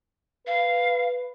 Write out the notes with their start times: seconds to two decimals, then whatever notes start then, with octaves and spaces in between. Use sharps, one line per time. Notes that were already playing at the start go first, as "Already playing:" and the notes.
0.47 B4 F5